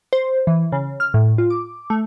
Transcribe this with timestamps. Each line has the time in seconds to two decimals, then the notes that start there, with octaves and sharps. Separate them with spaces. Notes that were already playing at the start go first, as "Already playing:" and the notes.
0.13 C5
0.47 E3
0.72 C#3
1.00 F6
1.14 A2
1.38 F4
1.50 D6
1.90 A3